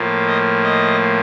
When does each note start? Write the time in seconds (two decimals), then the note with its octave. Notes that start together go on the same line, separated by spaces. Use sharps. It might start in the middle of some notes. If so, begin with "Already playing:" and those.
Already playing: A2 F3 A#3
0.27 D#5
0.63 D#5